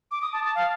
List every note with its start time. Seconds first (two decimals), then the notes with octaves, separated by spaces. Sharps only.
0.11 D6
0.22 D#6
0.33 A5
0.44 A5
0.55 F5